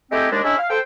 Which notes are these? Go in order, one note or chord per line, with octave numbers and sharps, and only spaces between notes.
G#3 A3 C4 D#4 E4 G4
D#2 G#3 D4
G#3 C#4 D4 E4
F5
A4 C5 G5